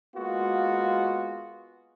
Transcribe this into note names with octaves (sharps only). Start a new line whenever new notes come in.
G#3 A#3 B3 F4 F#4